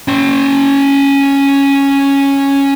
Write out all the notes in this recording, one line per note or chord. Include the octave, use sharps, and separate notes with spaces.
C#4 G5